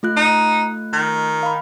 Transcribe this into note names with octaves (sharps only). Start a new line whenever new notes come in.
A3 F4 F#6
D#4
D#3
F5 B5